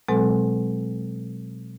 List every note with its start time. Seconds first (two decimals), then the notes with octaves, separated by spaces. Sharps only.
0.08 B2 F#3 G#3 C4 A4